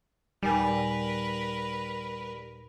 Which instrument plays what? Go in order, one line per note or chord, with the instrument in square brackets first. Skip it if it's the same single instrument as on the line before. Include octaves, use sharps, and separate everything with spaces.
[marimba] D#2 A#2 G#5 [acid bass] G3 [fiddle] A#4 B4